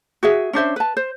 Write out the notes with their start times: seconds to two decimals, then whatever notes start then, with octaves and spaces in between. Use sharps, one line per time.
0.23 F#4 G#4 E5
0.53 C#4 D4 C5 E5
0.76 B4 A5
0.97 C5